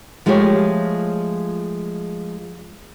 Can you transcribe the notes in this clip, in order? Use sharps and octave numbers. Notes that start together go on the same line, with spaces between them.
F3 G#3 A3 F4 G4 C#5